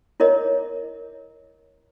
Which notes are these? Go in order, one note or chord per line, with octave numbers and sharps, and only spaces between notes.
E4 A#4 C#5 D#5